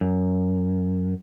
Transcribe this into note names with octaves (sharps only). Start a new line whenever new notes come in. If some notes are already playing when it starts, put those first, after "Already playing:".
F#2